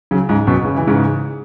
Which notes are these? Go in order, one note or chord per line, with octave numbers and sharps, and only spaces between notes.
C#3 F#3
G#2 C#3
F#2 B2
C#3
E3
G#2 C#3